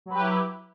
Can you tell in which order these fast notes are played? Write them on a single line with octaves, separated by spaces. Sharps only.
F#3 B4 G4 E4